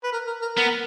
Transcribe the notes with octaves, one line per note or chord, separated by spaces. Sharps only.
B4
A#4
A#4
A#4
B3 A#4